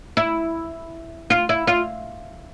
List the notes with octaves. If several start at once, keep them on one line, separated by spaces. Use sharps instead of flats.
E4
F4
E4
F4